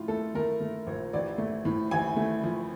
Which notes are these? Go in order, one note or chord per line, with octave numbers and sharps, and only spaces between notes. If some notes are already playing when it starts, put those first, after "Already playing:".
Already playing: A2 F3 F4
A3 A4
A3 A#4
A3
A#1
A1 D5
A3
A2
A1 G#5
A3
F3